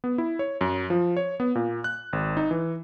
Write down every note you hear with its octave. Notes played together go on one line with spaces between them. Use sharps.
B3
E4
C#5
F#2
F3
C#5
B3
A#2
F#6
G#1
D#4
E3